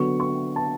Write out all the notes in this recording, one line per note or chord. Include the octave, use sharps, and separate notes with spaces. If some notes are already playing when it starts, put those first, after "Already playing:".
Already playing: D3 F#3 B3 C#6
C#6
A5